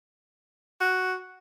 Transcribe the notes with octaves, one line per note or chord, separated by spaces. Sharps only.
F#4